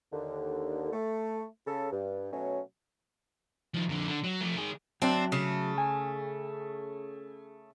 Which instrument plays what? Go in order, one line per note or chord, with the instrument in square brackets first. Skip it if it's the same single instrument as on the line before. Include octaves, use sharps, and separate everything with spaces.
[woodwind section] D#2 D3
A3
C#3 A4
G2
B2 F#3 A3 C#4
[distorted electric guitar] D#3 F3
F2 D3
D3
F#3
F3 A3
D#3 G#4
[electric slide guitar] F#3 E5 A5 [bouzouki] C4 D4
[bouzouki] C#3 A3
[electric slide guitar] G#5